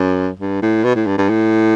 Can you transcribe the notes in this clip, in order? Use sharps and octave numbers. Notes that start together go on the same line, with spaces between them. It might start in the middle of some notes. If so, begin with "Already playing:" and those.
Already playing: F#2
G2
A2
B2
A2
G2
G2
A2